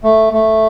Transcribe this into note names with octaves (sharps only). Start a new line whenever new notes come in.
A3
A3